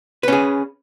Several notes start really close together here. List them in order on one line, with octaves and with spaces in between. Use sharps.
B4 C#4 G#4